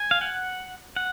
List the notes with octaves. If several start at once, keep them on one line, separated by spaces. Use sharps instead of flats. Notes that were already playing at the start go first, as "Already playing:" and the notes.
Already playing: G#5
F5
F#5
F#5